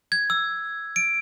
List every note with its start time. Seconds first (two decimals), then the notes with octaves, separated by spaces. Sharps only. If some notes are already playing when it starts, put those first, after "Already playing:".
0.12 G#6
0.30 E6
0.96 D7